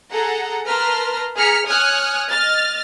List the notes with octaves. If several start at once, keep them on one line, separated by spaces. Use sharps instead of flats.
G#4 A4 F#5 A#5
A#4 B4 A5 A#5 C6 F6
G#4 A#5 F6 B6 C#7
C#5 G#5 D#6 F6 F#6 G#6
D#5 F6 A6